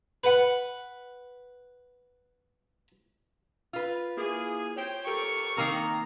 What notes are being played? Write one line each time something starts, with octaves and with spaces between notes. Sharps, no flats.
B4 F#5
F4 B4
A#3 E4 G#4
C5 C#5 G5
G4 A4 A#4 C#6
D#3 A#3 C4 A#5